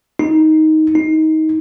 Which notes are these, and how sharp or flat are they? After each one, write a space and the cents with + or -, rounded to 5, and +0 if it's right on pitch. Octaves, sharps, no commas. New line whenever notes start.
D#4 +10
D#4 +20